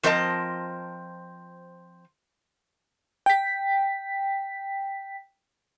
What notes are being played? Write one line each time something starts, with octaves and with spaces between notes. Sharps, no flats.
F3 C4 A#4 D#5 A5
G5 B6